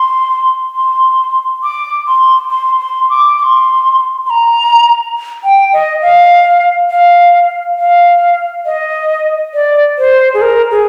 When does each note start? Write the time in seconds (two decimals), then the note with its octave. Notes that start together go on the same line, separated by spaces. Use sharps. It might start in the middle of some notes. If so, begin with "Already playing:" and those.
Already playing: C6
0.75 C6
1.63 D6
2.07 C6
2.51 C6
2.80 C6
3.10 D6
3.39 D6
3.43 C6
4.26 C6
4.30 A#5
5.44 G5
5.73 D#5
6.02 F5
6.90 F5
7.79 F5
8.66 D#5
9.54 D5
9.98 C5
10.34 G#4
10.42 A#4
10.71 G#4